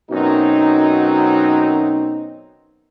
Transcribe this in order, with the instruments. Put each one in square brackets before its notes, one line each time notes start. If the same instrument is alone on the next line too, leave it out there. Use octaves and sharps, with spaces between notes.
[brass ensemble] F#2 B2 F#3 C4 D#4